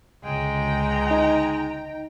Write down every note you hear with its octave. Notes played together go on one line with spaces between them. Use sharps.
C#2 D3 G#3 G5 A#5
D#4